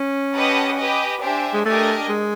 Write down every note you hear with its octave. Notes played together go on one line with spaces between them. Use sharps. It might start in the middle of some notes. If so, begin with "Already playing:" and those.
Already playing: C#4
G4 B4 D#5 F#5 A5
G4 B4 D#5 G#5
D4 G4 C5 E5 G#5
G#3
A3 D4 G4 A#4 D#5 G#5
G#3